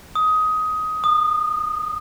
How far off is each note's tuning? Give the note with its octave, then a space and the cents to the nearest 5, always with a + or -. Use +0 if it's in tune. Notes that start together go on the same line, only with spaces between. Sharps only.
D#6 +15
D#6 -30